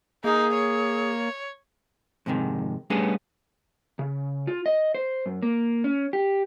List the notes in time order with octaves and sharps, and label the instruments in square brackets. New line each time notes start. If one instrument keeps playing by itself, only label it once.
[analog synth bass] A#3 [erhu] D#4 [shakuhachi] G#4
[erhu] C#5
[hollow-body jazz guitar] F2 G#2 C3 D#3
G3 A3 B3 C#4 D4 G#4
[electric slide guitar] C#3
F4
D#5
C5
F#2
A#3
C#4
G4